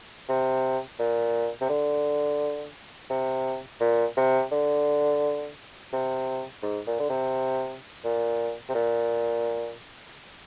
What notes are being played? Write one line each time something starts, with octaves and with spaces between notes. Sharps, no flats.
C3
A#2
C3
D3
C3
A#2
C3
D3
C3
G#2
A#2
D3
C3
A#2
C3
A#2